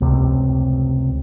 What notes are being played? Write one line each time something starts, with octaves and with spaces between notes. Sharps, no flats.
F1 C#2 C3